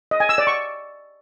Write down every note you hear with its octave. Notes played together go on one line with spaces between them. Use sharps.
D#5
G#5
E6
D5
C#6